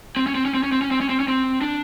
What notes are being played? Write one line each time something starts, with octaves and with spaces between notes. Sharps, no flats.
C4
C#4
C4
C#4
C4
C#4
C4
C#4
C4
C#4
C4
C#4
C4
D4